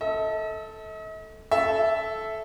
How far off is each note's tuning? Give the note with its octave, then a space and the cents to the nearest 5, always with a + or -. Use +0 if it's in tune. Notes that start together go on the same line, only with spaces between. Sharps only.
A4 +0 D#5 +45
A4 -15 E5 +0